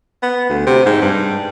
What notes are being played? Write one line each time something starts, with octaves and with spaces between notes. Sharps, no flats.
B3
D2
C3
G#2
G2